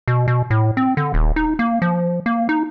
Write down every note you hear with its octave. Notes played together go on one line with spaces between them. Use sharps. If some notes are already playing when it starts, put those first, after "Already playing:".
B2
B2
A2
C4
D3
D#1
D#4
A#3
F3
A#3
D#4